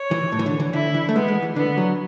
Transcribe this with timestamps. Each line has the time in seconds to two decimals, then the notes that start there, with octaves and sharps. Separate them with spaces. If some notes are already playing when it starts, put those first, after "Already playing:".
Already playing: C#5
0.11 E3
0.32 A2
0.39 E3
0.46 D3
0.60 E3
0.73 D3 E4
0.94 E3
1.09 A3
1.16 G#3 B3
1.28 G#3
1.42 E3
1.56 D3 B3
1.77 F#3